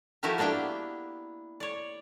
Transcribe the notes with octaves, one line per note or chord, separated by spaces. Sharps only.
F3 A3 E4 F#4 G4 A#4
A#3 B3 D4 E4 G5
C#5 D5